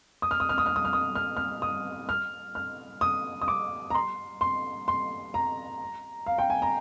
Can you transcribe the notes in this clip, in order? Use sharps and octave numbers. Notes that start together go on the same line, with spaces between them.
D#6
F6
D#6
F6
D#6
F6
D#6
F6
D#6
F6
F6
D#6
F6
F6
D#6
D#6
D6
A#5
C6
C6
C6
A#5
F5
G5
G#5
A#5